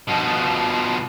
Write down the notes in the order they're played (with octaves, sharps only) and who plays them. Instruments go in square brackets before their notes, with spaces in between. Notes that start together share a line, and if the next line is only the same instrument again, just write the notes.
[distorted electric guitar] B2 F3